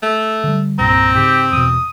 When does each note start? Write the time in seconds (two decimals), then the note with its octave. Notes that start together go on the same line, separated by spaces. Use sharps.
0.03 A3
0.44 D3 G3
0.79 C2 G2 A#2 C4 A#5
1.15 G#2 C#3 G4
1.52 E2 B2 D#6